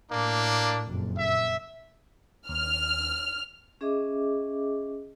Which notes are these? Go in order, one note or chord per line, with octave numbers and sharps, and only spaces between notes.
A2 A#3 D4
F#1 F2 A#2
A#2 E5
D#2 F6
C#4 G#4 D#5 E5 D6